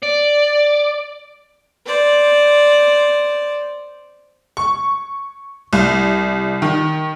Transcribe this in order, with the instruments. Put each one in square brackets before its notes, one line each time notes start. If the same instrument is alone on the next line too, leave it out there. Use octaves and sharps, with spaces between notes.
[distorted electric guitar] D5
[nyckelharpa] C5 D5
[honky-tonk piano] C#6
C2
D#3